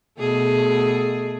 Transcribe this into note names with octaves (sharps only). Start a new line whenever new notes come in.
B2 A3 G#4